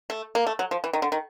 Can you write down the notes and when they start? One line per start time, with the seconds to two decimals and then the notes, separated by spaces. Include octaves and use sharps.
0.10 A3
0.35 A#3
0.47 A3
0.59 F#3
0.71 F3
0.84 E3
0.93 D#3
1.02 D3
1.12 D#3